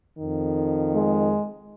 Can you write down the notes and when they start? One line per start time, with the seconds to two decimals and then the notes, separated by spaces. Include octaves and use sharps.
0.18 F2 D#3
0.93 G#3